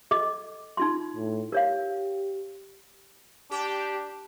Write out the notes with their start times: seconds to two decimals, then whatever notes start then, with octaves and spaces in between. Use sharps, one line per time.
0.11 A4 D#5 D6
0.77 D#4 F4 C6
1.16 A2
1.52 G4 A#4 C#5 F5
3.51 D4 G4